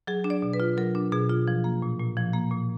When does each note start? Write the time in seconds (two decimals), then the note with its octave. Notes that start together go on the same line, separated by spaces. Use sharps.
0.07 F#3 G#4
0.24 D4
0.30 D5
0.42 B2
0.53 B4
0.60 F4
0.77 F#3 A#4
0.95 D4
1.12 B2 G#4
1.29 F4
1.48 F3
1.64 A#3
1.82 A#2
1.99 A#2
2.17 F3
2.33 A#3
2.51 A#2